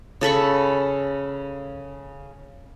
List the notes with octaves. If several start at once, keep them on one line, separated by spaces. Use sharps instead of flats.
C#3 A4 B5 C#6